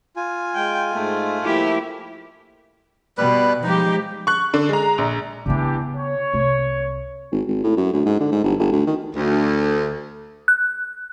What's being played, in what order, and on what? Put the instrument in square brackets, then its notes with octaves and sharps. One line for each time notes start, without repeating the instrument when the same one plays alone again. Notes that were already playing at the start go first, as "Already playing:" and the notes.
[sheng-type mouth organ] F4 G#5
[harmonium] G#3 [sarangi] G5
[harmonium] G#2 G#3 [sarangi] A3
[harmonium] F3 A#3 [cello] E4 G4
[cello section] B2 [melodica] G3 B4
[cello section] F3 G#3 G4 [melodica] D#4
[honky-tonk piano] C#6 F#6
D3
G#3 A#5
A#1
[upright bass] C#3 B3 [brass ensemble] E3 D4 G4
[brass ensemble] C#5
[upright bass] C2
[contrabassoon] G#1
G#1
A2
F#2
D2
G#2
D3
G#2
G1
G1
D2
D#3
[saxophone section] D2
[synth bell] F#6